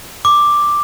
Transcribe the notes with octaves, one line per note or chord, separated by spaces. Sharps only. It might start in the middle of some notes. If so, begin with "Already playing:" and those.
D6